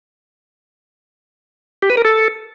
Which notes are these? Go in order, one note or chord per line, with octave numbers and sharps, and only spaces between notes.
G4
B4
A#4
A4